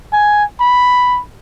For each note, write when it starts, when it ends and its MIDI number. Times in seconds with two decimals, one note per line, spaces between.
0.13 0.44 80
0.60 1.20 83